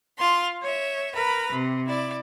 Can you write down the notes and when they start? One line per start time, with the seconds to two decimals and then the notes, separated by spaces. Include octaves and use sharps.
0.17 F4 C6
0.62 C#5 E5
1.15 A#4 B4 A#5 B5
1.52 C3
1.87 E4 D5